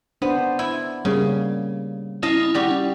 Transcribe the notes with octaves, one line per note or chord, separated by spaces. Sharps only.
B3 D4 C5
E4
C#3 G3 A#3
C#4 E4 D#5 F5 A5
G3 F#4 G4